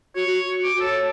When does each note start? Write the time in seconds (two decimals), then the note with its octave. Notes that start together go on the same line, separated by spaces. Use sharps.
0.15 F#4 C#5
0.30 F#4
0.63 F#4 D6
0.80 A4 C#5